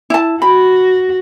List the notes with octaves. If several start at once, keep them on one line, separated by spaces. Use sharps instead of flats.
E4 A5
F#4 B5